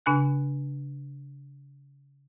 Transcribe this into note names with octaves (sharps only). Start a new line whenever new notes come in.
C#3 D4 G#5 F#6